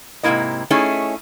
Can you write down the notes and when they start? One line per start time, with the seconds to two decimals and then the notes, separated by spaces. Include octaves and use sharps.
0.23 G#2 C3 E3 A#3 E4 D#5
0.70 A3 C#4 D#4 E4 G#4